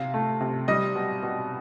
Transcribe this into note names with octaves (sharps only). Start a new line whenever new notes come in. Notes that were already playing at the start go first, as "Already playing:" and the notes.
Already playing: C3 F5
A3
C3
G3 D#5
B2
B2